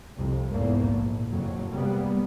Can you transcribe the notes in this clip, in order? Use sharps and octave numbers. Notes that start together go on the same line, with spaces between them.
C2 F2 C3
E2 G#2 A3 A#3
A#1
F#1 F2 A2 F#3
C3 G3 G#3 A#3 B3